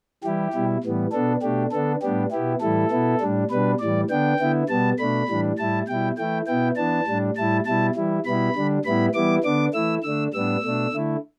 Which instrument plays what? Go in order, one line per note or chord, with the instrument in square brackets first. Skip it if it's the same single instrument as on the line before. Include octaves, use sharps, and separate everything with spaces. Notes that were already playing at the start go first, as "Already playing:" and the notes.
[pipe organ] E3 G3 E4 G4
B2 G3 E4
A2 E3 G3 B3
B2 B3 D4 A4
B2 A3 D4 G4
D3 B3 D4 A4
A2 G3 B3 D4 G4
B2 B3 E4 G4
A2 E3 G3 E4 A4
B2 B3 E4
A2 G3 D4
B2 G3 D4 B4
A2 E3 G3 D5
D3 B3 D4 G5
D3 B3 E4
B2 G3 B3 A5
B2 A3 D4 B5
A2 E3 G3 D4
A2 G3 E4 A5
B2 G3 E4 G5
E3 A3 E4 G5
B2 B3 E4 G5
E3 B3 D4 A5
A2 G3 D4
A2 G3 E4 A5
B2 G3 E4 A5
E3 G3 E4
B2 G3 B3 E4 B5
D3 G3 D4
A2 G3 B3 E4 B5
E3 G3 B3 E4 D6
D3 B3 D4 D6
E3 A3 E4 E6
D3 A3 D4 E6
A2 G3 B3 D4 E6
B2 A3 D4
D3 A3 E4